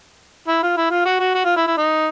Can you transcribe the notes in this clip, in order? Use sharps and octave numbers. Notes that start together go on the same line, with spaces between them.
E4
F4
E4
F4
F#4
F#4
F#4
F4
E4
E4
D#4